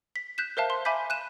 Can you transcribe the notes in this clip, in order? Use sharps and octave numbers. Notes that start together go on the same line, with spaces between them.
B6
F#6 G6 B6 E7
A#4 C5 E5 F5 A5
C6
E5 G#5 B5 D6 G6 B6
F#6 D#7 E7